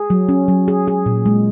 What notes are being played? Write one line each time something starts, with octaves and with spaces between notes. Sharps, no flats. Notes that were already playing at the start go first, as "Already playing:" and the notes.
Already playing: G#4
F#3
C#4
F#3
G#4
G#4
A#2
G#3